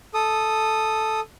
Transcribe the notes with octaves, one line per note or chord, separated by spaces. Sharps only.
A4 D#6